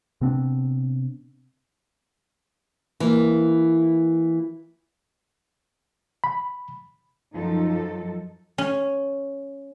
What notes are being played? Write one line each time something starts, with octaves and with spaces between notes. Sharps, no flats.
C3 B3 C4 D4
E3 A#3
B5
F#2 F3 F#3 D#4 A4
C#4